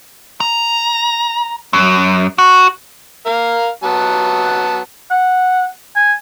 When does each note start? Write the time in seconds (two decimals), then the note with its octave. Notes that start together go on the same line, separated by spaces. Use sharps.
0.40 A#5
1.73 F#2
2.38 F#4
3.26 A#4 F5
3.83 F#3 B3 A5
5.11 F#5
5.96 G#5